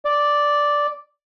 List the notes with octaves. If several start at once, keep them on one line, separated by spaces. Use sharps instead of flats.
D5